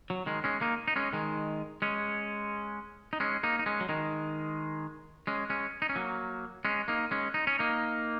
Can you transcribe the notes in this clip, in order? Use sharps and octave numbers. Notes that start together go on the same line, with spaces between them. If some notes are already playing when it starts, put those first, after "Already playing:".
F#3
D#3 G#3
G#3 C#4
A#3 D#4
D#4
G#3 C#4
D#3 G#3
G#3 C#4
D#4
G#3 C#4
A#3 D#4
D#4
G#3 C#4
F#3
D#3 G#3
G#3 C#4
G#3 C#4
D#4
C#4
F#3 A#3
G#3 C#4
A#3 D#4
G#3 C#4
D#4
C#4
A#3 D#4